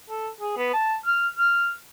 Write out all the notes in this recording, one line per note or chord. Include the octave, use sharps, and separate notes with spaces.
A4
G#4
B3
A5
F6
F6